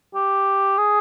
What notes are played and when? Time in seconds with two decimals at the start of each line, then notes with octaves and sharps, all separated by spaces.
0.15 G4
0.78 G#4